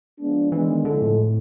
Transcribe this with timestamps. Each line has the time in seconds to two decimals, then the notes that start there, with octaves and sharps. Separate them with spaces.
0.18 F3 G#3 B3 D4
0.52 E3 G#3 B3 D4
0.68 D#3
0.84 D3 F3 G#3 C4 E4 A4
1.02 A2